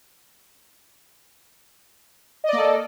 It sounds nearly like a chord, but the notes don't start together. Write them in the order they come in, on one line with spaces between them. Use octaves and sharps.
D#5 D5 A#3 A4